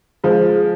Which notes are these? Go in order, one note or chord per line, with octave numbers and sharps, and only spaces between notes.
F3 G#3